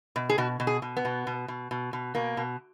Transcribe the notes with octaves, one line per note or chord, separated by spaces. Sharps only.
B2
G#4
B2 F#4
B2
G#4
B2
B3
B2
B2
B2
B2
B2
B2 A#3
B2